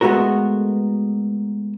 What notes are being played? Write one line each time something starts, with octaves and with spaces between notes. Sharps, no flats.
G#3 A3 B3 F#4 A#4